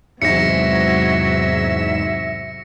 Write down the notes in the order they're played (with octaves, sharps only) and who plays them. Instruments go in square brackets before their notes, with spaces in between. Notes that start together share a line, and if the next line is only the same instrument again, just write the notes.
[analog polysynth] E2 G#2 E7 [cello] C3 F#3 [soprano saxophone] E5 [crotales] A#6 C#7